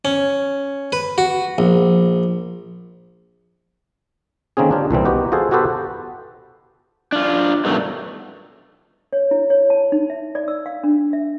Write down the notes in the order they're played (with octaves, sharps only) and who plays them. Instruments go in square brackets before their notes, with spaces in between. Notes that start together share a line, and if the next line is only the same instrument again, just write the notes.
[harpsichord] C#4
B4
F#4
A#1
[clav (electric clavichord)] D3 D#3 A#3 C4 C#4 G#4
D4 F4 G4
C2 A#2 E3 C4
B3 D#4 F#4 G4
F4 F#4 G#4 A4 C5
B3 F#4 G4 A4 B4 C5
[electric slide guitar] D4 F4
G2 B2 D#3 F#3 A3
[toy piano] C#5
E4
C#5
A5
D#4
E5
D5
E6
F5
D4
E5